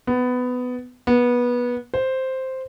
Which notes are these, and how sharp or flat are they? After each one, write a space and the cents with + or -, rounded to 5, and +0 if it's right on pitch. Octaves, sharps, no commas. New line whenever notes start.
B3 +15
B3 -20
C5 +0